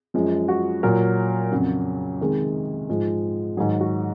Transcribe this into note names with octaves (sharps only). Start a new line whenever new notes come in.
F#2 F3 G#3
F#4
A#2 F#3 A#4
F2 C#3 F#3
C3 D#3 G#3 G#4
G#2 F3 G#3
G#2 D#3 F#3 G#4
F#4